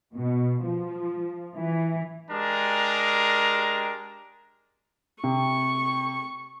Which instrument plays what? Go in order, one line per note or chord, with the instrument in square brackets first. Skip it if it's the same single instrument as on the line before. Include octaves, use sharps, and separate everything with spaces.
[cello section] B2
F3
E3
[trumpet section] G#3 D4 G4 A#4 A#5
[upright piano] C3 [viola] C#6